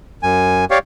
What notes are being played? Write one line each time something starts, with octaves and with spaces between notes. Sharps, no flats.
F#2 G#5
G4 C#5 D5 F5